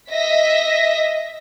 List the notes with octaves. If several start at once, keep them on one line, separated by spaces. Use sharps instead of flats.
D#5 E5 A#6 B6